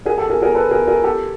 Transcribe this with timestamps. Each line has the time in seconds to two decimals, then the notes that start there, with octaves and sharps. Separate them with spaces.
0.06 G#4 A#4
0.18 G4 A4
0.30 G#4 A#4
0.42 G#4 A#4
0.55 A4 B4
0.71 G#4 A#4
0.88 G#4 A#4
1.04 G4 A4